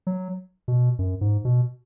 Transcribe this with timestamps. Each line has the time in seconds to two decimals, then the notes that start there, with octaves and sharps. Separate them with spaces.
0.07 F#3
0.68 B2
0.99 F#2
1.21 G#2
1.45 B2